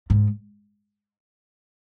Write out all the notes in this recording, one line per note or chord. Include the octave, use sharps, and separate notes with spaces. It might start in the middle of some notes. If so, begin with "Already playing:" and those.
G#2